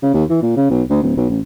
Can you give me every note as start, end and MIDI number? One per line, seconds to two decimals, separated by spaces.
0.03 0.10 49
0.14 0.24 39
0.30 0.39 52
0.42 0.56 46
0.56 0.67 49
0.70 0.83 35
0.90 1.02 38
1.03 1.14 26
1.17 1.28 35
1.30 1.40 33